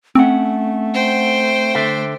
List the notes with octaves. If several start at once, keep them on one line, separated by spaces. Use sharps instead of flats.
A3 C4 C#4 F#5
C5 G5
D3 A4 E5